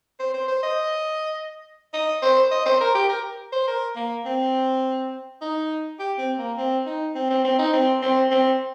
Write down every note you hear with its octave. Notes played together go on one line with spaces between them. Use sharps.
C5
C5
C5
D#5
D#5
C5
D#5
C5
A#4
G4
A#4
C5
A#4
A#3
C4
D#4
G4
C4
A#3
C4
D#4
C4
C4
C4
D#4
C4
C4
C4